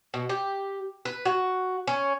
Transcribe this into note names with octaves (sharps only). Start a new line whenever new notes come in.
B2
G4
B4
F#4
C#4